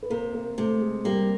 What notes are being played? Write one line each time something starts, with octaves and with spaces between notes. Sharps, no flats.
B4
C3 A#3 A#4
A#3 A#4
C3 A3 A4
G#3 G#4
G3 A#3 G4